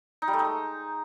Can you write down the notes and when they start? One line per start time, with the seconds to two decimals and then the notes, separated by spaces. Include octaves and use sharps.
0.22 D#4
0.28 G3
0.33 A3
0.39 D#4
0.45 G#3